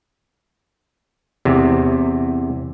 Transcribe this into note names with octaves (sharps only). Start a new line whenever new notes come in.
E2 C3